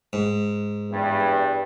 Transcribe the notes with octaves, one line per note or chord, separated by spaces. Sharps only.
G#2
E2 G2